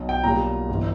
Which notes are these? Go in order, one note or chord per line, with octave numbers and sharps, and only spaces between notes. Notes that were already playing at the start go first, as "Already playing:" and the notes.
Already playing: B1
G5
B1 A#2 G3 A#5
G1 E3